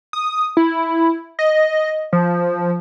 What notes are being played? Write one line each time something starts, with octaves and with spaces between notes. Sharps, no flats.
D#6
E4
D#5
F3